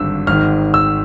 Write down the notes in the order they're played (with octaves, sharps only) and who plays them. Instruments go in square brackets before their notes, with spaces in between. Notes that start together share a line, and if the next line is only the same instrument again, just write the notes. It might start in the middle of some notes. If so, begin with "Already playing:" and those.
Already playing: [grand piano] G#1 G2 D3 E6
G#1 G#2 D#3 F6
E6